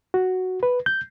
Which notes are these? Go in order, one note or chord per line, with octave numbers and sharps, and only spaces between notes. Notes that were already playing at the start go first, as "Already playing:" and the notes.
F#4
B4
G6